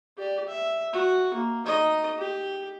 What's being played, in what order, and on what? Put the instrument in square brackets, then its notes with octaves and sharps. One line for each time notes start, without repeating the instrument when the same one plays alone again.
[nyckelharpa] G4 D5
E5
F#4
A#3
D#4 D#5
G4